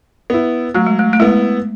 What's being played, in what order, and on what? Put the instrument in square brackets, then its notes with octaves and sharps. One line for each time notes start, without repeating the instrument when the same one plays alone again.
[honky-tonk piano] B3 E4
[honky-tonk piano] F#3 [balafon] A3
[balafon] G#3
A3
A3
[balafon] G#3 [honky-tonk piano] B3 E4